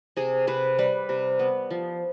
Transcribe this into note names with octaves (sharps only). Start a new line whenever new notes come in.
C3 G#4
C3 B4
G3 B4
C3
B3
F3